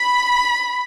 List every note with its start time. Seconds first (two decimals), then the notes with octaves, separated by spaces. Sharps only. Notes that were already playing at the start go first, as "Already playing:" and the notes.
Already playing: B5